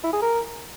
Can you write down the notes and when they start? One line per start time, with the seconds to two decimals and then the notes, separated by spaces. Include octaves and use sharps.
0.04 E4
0.13 G#4
0.22 A#4